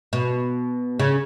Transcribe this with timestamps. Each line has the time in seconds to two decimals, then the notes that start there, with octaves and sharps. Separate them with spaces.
0.13 B2
0.99 C#3